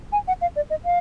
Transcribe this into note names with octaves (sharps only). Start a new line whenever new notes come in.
G#5
F#5
F5
D5
D#5
F5